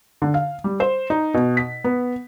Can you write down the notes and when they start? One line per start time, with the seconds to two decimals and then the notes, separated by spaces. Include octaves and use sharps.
0.22 D3
0.34 F5
0.64 G3
0.80 C5
1.10 D#4
1.34 B2
1.57 B6
1.84 B3